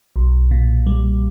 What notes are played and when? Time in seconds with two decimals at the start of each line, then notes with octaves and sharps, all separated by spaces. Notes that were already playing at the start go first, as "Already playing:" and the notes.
0.16 B1
0.51 A#2
0.86 G3